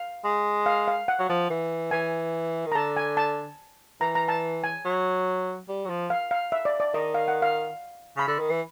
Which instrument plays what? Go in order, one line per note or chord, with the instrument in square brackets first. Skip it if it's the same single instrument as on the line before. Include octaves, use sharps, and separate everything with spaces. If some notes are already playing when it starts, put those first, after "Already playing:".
Already playing: [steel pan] F5
[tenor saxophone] G#3
[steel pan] F5
F5
F#5
[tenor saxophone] F#3
F3
E3
[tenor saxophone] E3 [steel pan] G#5
[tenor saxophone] D#3
[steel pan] A#5
[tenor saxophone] D3 [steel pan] A5
[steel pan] G#5
A5
[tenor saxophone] E3 [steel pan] A#5
[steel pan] A#5
A5
G#5
[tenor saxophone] F#3
G3
F#3
F3
[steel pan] F5
F5
E5
D5
D5
[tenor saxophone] D#3 [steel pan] D#5
[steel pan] F5
F#5
F5
[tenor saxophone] C#3 [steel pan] B5
[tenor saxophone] D3
D#3
E3